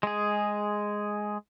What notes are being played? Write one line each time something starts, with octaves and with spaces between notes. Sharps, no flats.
G#3 G#4